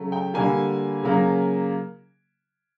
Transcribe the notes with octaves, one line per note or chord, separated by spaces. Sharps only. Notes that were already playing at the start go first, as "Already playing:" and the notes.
Already playing: C#3 F#3 A3
G5
D3 G3 A#3 G#5
C#3 F#3 A#3